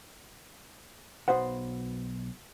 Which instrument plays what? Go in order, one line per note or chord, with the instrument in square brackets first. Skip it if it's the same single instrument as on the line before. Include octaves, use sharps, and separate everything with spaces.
[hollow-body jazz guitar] B1 B3 F#4 C5 F#5